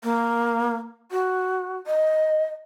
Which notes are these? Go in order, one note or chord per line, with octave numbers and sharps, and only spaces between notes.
A#3
F#4
D#5